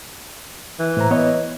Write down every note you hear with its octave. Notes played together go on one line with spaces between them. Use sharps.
E3
A2 C5 A#5
B3 C#5 D#5